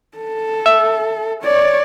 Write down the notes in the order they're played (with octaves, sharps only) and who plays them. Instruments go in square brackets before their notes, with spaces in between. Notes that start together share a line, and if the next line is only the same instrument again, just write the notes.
[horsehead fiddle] A4
[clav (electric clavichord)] E5
[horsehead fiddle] C#5 D5